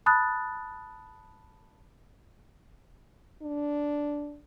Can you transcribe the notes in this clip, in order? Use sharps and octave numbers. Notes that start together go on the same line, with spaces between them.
A5 B5 D#6 F#6 A6
D4